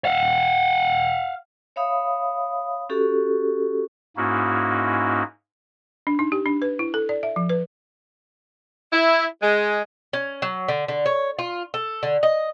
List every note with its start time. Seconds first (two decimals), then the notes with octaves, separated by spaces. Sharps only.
0.05 F5 F#5
1.76 C#5 E5 F5 B5 D#6
2.89 C#4 F#4 G4 A4
4.17 G#2 A#3 C#4 D#4 E4 F#4
6.07 D4
6.19 D#4
6.32 G4
6.46 D4
6.62 B4
6.79 E4
6.94 A4
7.09 D5
7.23 E5
7.36 F3
7.49 B4
8.92 E4
9.42 G#3
10.13 C#4
10.42 F#3
10.68 D3
10.88 D3
11.06 C#5
11.39 F4
11.74 A4
12.03 D3
12.23 D#5